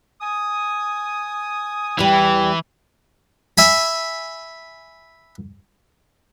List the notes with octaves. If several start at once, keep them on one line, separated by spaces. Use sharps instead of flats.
G#5 D#6
E2 E3 G3 B5
E5 G#5 B5